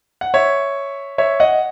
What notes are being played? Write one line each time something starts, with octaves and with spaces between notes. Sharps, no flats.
F#5
C#5 E5
C#5 E5
D#5 F#5